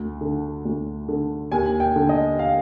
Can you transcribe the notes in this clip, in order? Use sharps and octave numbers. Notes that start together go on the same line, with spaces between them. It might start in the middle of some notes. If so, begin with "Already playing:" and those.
Already playing: D2
D3
D2
D3
D#2 G#5
G5
D3
D#5
F5